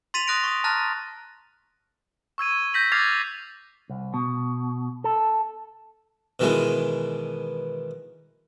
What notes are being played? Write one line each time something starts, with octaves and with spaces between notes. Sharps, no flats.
C6 A6 B6 D#7 F7
D#6 F#6 A#6 D7
C#6 D#6
A5 A#5 F6 F#6 A6 A#6
C#6 E6 G#6 D#7
G6 A#6 B6 F#7
D6 F6 G#6 A6 C7 F7
C2
B2
A4
B2 D#3 E3 G#3